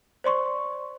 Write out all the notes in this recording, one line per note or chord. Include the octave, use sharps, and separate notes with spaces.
C5 D5 C6 C#6